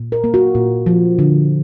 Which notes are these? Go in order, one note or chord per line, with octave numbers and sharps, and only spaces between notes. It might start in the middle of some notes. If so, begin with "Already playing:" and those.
Already playing: A#2
A#4
A#3
F#4
A#2
F3
D3